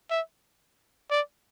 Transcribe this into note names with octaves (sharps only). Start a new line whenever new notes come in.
E5
D5